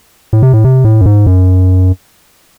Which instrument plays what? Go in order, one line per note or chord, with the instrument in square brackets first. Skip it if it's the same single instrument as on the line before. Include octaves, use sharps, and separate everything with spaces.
[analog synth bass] A2
C3
A2
C3
A2
F#2
G#2
F#2